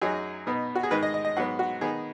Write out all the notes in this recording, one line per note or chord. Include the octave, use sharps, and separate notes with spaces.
F#2 F#3 D#4 G#4
B2 B3 D#4
F#4
G#4
G#2 D#3 G#3 B4
D#5
D#5
D#5
G#2 F#3 B3 F#5
F#4
D#3 B3 D#4 G#4